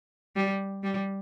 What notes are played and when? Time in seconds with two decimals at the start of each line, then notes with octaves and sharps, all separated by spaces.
0.36 G3
0.83 G3